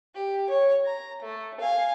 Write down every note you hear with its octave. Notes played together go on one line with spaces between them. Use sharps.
G4
C#5
A#5
A3
F5 G#5